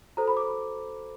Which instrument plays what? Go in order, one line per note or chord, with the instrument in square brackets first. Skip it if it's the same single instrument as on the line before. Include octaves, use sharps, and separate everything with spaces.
[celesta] F#4 A4 C5 A#5
B5
D6